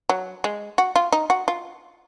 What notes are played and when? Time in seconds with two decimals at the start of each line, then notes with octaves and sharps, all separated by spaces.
0.09 F#3
0.44 G#3
0.78 F#4
0.96 F4
1.12 D#4
1.30 F#4
1.48 F4